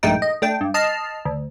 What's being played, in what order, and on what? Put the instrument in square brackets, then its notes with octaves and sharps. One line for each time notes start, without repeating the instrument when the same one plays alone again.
[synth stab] A#1 G2 G#3 A3 D#4 G5
D#5
A3 D4 G5
G2
D#5 A5 F6 C7
D2